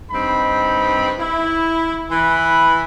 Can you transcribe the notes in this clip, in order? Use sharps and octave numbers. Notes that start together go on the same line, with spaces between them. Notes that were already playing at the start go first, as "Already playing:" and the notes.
G2 C4 D#4 B5
E4
E3 B5